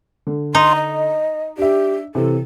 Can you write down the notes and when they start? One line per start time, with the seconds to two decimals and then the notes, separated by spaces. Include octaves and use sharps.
0.27 D3
0.55 D#4 C6
0.75 D#5
1.58 D4 G4 E5
2.15 C3 E3 A4